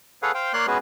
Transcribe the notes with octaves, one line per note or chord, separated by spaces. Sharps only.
G#4 A4 B4 C#5 F5 F#5
C5 F5 G5
A#3 C#5 D5 F5 C6 F#6
G#3 B3 C#4 F#4 G#4 B4